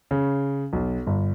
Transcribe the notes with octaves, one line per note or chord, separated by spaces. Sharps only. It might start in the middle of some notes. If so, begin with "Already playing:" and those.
C#3
B1
G1